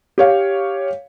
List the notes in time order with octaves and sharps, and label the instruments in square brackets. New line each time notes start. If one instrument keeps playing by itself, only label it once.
[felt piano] G4 C#5 F5